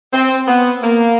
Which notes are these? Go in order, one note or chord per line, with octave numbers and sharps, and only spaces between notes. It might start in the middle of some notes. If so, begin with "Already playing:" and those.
C4
B3
A#3